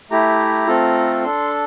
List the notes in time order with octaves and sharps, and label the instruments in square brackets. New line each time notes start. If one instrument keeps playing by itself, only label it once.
[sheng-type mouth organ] A3 E4 G4 A#5
A3 C4 F4 A4
D4 A4 C6